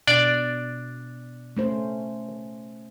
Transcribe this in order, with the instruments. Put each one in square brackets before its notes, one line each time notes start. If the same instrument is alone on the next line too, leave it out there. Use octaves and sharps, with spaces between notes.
[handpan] B2 [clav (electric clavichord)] D4 D5
[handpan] A3 C#4 C5